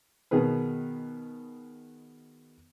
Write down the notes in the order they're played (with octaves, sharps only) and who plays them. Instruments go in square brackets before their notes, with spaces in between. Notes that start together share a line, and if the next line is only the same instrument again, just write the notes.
[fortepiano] B2 D#3 G#4 B4